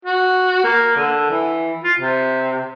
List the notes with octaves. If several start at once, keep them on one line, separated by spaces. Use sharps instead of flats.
F#4
A#3
D3
E3
F4
C3